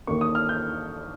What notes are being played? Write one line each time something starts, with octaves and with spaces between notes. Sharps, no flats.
D#2 D#3 A#3 C#6
D#6
F6
G6